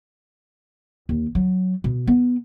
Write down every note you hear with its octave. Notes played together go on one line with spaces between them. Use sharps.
D#2
F#3
B2
B3